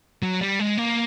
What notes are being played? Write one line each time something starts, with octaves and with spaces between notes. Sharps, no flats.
F#3
G3
G#3
A#3